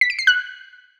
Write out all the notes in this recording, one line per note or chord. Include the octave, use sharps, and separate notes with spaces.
B6
D7
C7
F#6